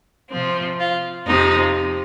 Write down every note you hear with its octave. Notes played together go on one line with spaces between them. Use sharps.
C3 F3 C4
F4
F2 C3 F3 D#4